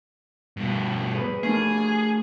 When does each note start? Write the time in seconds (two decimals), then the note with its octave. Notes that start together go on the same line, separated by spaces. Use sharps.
0.57 G2 B2
1.14 G#4 B4
1.43 A3 D4 G#4 A#4